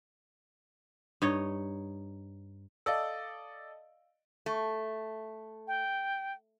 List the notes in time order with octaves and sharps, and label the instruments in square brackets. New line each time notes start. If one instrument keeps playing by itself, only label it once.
[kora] G2 D#4 C#5
[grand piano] A4 D5 D#5 [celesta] F5 E6
[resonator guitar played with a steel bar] A3
[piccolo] G5